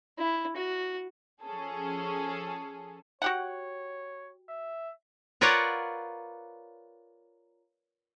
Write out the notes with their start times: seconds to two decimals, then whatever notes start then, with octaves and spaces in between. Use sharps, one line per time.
0.18 E4
0.57 F#4
1.42 F3 C#4 G#4 A4
3.22 F#4 G4 C#5 F#5
4.49 E5
5.41 F4 A#4 B4 C#5 D5 F#5